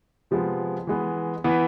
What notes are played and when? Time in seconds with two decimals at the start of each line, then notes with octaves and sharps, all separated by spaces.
0.31 C3 F3 G#3 B3
0.87 E3 G#3 B3
1.44 E3 B3 E4